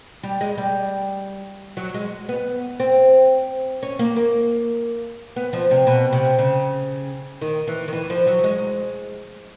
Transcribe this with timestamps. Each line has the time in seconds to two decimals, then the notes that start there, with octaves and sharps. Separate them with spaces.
0.23 G3
0.41 G#3
0.58 G3
1.77 F#3
1.94 G#3
2.29 B3
2.80 C4
3.83 C#4
3.99 A#3
4.16 A#3
5.36 B3
5.53 F3
5.71 C3
5.87 B2
6.13 C3
6.39 C#3
7.41 D#3
7.67 E3
7.88 D#3
7.93 E3
8.10 F3
8.27 F#3
8.44 G#3